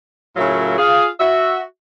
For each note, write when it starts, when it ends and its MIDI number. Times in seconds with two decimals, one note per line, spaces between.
0.36 0.77 45
0.36 0.77 49
0.36 0.77 54
0.36 0.77 65
0.36 0.77 70
0.36 0.77 76
0.78 1.08 65
0.78 1.08 68
0.78 1.08 77
1.20 1.60 66
1.20 1.60 76